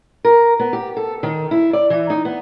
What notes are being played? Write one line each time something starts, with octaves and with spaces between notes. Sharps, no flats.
A#4
B3
G4
A4
D#3
E4
D5
E3
D#4
B3